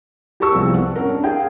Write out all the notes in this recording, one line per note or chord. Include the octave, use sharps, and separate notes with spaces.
G4 G#4 A#4 A5 C#6 E6
C2 F3 B3 C4
F#5
C#4 A#4
D4
G#4 F5 G5